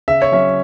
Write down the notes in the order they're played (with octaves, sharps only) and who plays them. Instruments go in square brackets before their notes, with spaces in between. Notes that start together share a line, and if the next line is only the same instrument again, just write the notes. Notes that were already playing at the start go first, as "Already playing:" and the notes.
[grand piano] C#3 E5
C#5
F#3 C#4 E5